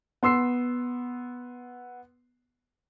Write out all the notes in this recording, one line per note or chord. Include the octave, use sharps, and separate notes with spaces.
B3 C6 E6 C7